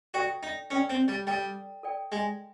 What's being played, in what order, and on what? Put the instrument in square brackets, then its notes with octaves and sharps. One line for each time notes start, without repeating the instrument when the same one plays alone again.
[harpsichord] F#4 [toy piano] A4 D5 G5
[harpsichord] D#4
[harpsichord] C#4 [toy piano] A4 D5 G5
[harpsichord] C4
G3
[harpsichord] G3 [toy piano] A4 D5 G5
[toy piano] A4 D5 G5
[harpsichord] G#3